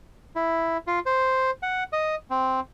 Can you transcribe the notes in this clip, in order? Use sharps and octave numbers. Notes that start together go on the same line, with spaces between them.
E4
F4
C5
F#5
D#5
C4